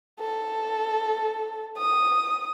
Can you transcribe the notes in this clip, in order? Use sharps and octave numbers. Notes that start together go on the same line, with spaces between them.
A4
D#6